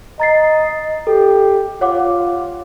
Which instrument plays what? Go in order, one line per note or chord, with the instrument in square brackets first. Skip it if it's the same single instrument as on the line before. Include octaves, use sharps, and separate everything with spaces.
[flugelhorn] D#5 [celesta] A#5 A6 C7
[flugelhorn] G4 [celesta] A4
[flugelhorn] F4 [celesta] C#5 F#5 D6